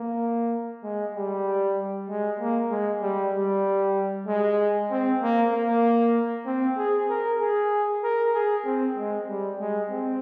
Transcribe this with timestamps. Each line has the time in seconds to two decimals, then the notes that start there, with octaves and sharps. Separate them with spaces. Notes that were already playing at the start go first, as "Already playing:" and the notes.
Already playing: A#3
0.84 G#3
1.15 G3
2.09 G#3
2.40 A#3
2.71 G#3
3.02 G3
3.34 G3
4.27 G#3
4.91 C4
5.22 A#3
5.53 A#3
6.46 C4
6.78 G#4
7.09 A#4
7.40 G#4
8.03 A#4
8.34 G#4
8.65 C4
8.97 G#3
9.28 G3
9.60 G#3
9.90 C4